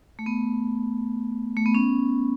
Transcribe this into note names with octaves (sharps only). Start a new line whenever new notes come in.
A3
B3
A3
B3
C#4